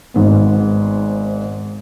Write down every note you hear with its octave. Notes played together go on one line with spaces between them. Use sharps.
G#1 G#2 B3